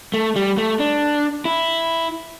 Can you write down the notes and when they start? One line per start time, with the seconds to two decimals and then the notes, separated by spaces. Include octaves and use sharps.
0.14 A3
0.36 G3
0.58 A3
0.80 D4
1.45 E4